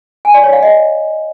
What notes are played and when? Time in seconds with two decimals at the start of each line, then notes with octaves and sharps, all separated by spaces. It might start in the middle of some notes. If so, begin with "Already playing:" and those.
0.25 G#5
0.34 D5
0.44 C#5
0.53 F5
0.62 D#5